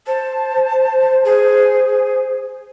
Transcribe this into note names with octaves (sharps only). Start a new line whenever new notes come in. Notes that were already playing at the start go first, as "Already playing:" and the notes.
C5 A5
G#4